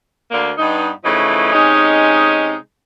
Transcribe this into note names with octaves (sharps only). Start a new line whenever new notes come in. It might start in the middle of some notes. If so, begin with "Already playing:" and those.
D2 D3 A#3
G2 B3 D#4
C#3 E3 F3 A3 D#4
C3 G#3 C#4 D#4